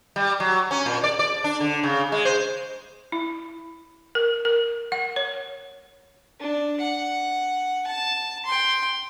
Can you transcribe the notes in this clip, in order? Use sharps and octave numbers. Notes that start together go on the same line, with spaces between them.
G3
F#3
C#4
A#2
D5
D5
D4
D3
C#3
G#3
C5
E4
A#4
A#4
F#5
C#5
D4
F#5
A5
G5 C6